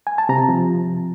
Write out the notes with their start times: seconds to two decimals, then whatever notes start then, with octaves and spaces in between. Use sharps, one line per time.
0.07 G#5
0.18 A5
0.29 C3 A#5
0.49 F3